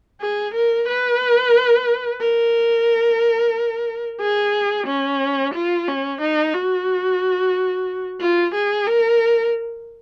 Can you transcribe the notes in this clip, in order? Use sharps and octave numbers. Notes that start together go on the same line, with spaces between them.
G#4
A#4
B4
A#4
G#4
C#4
F4
C#4
D#4
F#4
F4
G#4
A#4